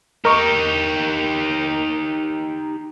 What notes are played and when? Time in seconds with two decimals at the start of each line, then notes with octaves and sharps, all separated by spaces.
0.25 D#4 G4 A#4 D#5 C#6